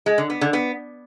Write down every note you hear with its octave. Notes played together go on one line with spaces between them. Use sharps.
G#3
D3
B3
D3
B3